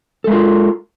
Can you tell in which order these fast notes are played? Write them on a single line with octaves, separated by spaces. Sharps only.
A4 G#3 A#4 F4